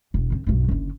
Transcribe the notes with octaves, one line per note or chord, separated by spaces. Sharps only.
E1
D3 C4
B1 G2
F#1 D3